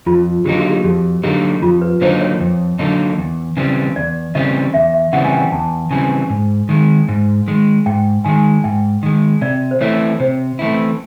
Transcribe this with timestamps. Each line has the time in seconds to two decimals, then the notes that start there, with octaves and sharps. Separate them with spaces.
0.06 F2 F4
0.45 D3 F#3 A#3 D#4 G4
0.58 F#4
0.70 G4
0.84 F2 G4
1.23 D3 F#3 A#3 D#4 G4
1.62 F2 F4
1.82 B4
2.01 D3 F#3 A#3 D#4 C5
2.21 C#5
2.41 F2
2.79 D3 F#3 A#3 D#4
3.18 E2
3.57 C#3 E3 G3 C4
3.96 E2 D5
4.35 C#3 E3 G3 C4 D#5
4.74 E2 E5
4.94 E5
5.13 C#3 E3 G3 C4 F#5
5.25 G#5
5.33 G5
5.52 E2 A5
5.91 C#3 E3 G3 C4 G#5
6.30 G#2
6.69 D#3 G#3
7.09 G#2
7.48 D#3 G#3
7.86 G#2 G5
8.25 D#3 G#3 G#5
8.64 G#2 G5
9.03 D#3 G#3
9.41 C3 D5
9.71 C5
9.81 E3 A3 C4 E4 C#5
10.20 C3 C5
10.59 E3 A3 C4 E4